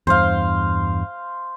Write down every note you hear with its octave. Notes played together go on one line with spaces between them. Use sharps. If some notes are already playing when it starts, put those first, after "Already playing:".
E2 G2 C5 F5